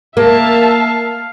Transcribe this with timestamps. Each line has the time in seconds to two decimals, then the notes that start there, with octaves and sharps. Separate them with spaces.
0.17 A#3 E5 F5 A5